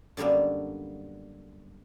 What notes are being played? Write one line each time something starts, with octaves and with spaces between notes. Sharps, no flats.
F#2 D3 G3 A#3 B3